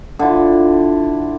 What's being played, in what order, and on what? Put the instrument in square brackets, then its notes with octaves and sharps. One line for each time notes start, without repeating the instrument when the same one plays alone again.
[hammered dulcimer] D3 E4 F4